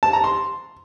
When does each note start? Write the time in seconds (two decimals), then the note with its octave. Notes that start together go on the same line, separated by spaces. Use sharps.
0.03 A5
0.13 A#5
0.24 C6